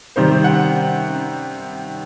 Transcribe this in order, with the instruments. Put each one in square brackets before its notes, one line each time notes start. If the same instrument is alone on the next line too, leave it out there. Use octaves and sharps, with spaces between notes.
[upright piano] C3 D#3 G3 C5
F#5